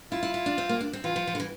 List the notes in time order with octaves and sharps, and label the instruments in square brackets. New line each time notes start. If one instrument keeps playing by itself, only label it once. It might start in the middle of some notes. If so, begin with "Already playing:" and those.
[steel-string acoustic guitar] E4 [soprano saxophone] F4
[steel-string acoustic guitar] E4
E4
D4
C4
A#3
D4
C4
[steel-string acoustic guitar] E3 [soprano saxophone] F4
[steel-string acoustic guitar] F3
F3
D3
E3